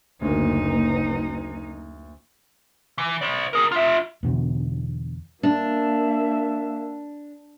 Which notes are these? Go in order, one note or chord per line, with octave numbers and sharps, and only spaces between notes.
F#1 D2 A#3 D#4
E3
C5 D5
G#4 A#4
F4 E5
E2 B2 D3
A#3 D4 E5